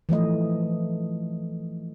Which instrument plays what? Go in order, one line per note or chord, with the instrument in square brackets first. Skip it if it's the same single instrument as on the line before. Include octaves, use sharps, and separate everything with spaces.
[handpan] E3 F3 A3 D#5